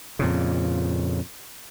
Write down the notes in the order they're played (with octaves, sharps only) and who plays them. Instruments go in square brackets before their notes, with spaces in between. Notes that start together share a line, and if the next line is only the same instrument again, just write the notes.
[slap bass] F2 A#2 C#3